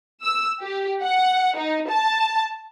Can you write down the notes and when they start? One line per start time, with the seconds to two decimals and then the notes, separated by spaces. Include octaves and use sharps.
0.22 E6
0.61 G4
1.02 F#5
1.56 D#4
1.89 A5